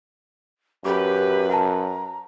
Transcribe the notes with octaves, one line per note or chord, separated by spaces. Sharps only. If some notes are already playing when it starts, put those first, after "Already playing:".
F#2 G4 B4 D6
F#5 A5 A#5